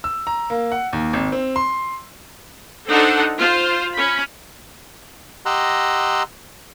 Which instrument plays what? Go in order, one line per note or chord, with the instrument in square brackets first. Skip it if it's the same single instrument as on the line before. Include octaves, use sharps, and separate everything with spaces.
[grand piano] E6
A#5
A#3
F#5
D#2
G#1
C4
C6
[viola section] D4 D#4 A4 C5 F#5
F4 C5
C#4 B5
[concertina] G4 D#5 F#5 A#5 C6 E6